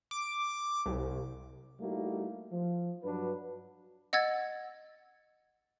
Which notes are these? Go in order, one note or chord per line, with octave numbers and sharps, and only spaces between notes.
D6
C2
G3 A3 A#3 D#4 E4 F#4
F3
G2 F#3 D4 F#4 B4
D#5 F#5 E6 G#6 A6